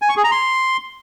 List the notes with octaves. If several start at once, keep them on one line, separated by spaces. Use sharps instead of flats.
G#5
C#6
G#4
A#5
C6